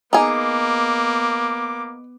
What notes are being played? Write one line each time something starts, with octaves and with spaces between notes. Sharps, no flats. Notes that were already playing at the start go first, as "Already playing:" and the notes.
A#3 B3 D#4 G#4 D6